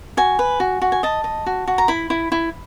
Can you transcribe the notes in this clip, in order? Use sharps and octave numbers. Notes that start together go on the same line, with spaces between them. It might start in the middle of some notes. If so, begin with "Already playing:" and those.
F#4 G#5
B4
F#4
F#4
G#5
D#5 A5
D#5
F#4
F#4
A#5
E4 B5
E4
E4